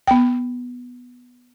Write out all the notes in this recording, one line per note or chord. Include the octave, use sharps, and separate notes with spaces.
B3 G5